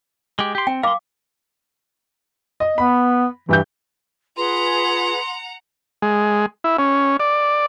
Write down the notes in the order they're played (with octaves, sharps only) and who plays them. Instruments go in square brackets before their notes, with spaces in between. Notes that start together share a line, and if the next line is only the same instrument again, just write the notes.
[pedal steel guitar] G#3 G4
G4 C6
[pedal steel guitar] C4 [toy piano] G5
[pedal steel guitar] A#4 C6 [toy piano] F5 D6
[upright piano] D#5
[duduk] B3 [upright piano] B5
[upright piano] G2 G4 G6 [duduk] E3
[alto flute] F4 [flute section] G#4 B4 [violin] F#5 A#5 [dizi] C6
[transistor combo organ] G#3
E4
C#4
D5